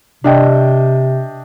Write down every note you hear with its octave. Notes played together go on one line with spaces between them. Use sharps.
C3 D4 D#5 G5